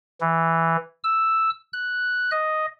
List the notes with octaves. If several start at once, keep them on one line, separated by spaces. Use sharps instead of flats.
E3
E6
F#6
D#5